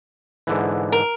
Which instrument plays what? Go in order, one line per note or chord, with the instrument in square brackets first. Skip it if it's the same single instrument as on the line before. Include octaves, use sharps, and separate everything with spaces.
[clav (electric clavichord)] G#2 D3 E3
[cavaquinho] A#4